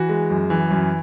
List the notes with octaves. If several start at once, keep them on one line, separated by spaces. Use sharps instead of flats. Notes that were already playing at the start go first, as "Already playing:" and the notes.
Already playing: E3 F#4
G#3
F#2
E3
F#2